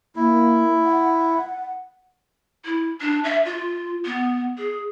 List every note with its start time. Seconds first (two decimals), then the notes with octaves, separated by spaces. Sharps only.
0.16 A#3 E4
0.85 F#5
2.65 E4
3.01 D4
3.24 E5
3.45 F4
4.05 B3
4.58 G#4